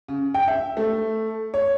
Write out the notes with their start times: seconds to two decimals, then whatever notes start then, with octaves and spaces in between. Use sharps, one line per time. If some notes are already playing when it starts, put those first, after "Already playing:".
0.08 C#3
0.34 G5
0.48 E5
0.77 A3
1.54 C#5